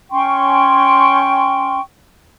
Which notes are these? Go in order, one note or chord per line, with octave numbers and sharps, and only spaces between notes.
C#4 G5 C6 C#6